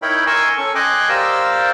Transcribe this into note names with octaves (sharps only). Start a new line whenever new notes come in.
D#4 E4 A#4 C#5 G5 B5
A#4 G#5 C6 C#6 E6
C#4 A4 C#6
D#5 G5 G#5 C6 D6 F#6
G4 A#4 C5 D5 F5 E6